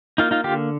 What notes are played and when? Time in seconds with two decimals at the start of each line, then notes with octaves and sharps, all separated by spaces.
0.18 A#3 D#4 F4
0.31 D#4 F4
0.44 D3 F4 G4